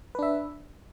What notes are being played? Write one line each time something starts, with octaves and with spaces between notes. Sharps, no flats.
D4 B4 E5